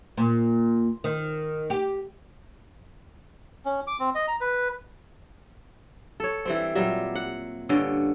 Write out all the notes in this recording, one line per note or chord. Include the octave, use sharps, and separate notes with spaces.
A#2
D#3
G4
C#4
D6
C4
D#5
A#5
B4
A4 C#5
E3 G3 C4
A#2 F#3 G3 E5
F#5
G2 D3 C#4 G5